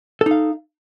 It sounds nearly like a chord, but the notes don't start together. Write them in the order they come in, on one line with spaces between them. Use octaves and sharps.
A4 D#4 F5